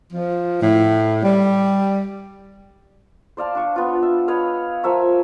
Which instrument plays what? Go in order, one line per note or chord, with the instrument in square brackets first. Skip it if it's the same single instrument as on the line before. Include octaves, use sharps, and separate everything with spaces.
[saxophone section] F3
A2
G3
[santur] C5 D5 F5 A5
D4 C#6 D6
B3 D4 F4
E5
B4 C#5 D#5 F5
F3 A#4 E5 C#6